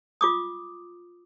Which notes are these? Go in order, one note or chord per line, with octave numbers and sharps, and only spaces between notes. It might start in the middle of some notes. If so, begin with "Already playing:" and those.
F4 D6 D#6